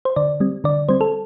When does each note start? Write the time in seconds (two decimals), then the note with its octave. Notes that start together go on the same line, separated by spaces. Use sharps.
0.05 C5
0.16 D3 D5
0.40 G3 C4
0.64 D3 D5
0.89 G3 C4 C5
1.01 A4